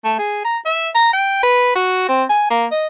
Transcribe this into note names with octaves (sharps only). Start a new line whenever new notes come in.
A3
G#4
A#5
E5
A#5
G5
B4
F#4
C4
G#5
A#3
D#5